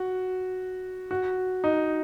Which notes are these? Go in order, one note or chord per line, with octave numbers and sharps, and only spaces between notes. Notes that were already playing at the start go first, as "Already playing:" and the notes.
Already playing: F#4
F#4
D#4